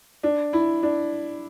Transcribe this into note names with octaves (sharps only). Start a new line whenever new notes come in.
D4
E4
D4